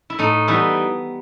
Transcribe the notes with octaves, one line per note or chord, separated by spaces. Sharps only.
E4
A2 D#4
E3 G3 B3 D#4 E4